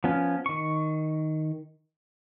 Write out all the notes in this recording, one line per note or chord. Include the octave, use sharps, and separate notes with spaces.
F3 B3 C#4
D#3 C#6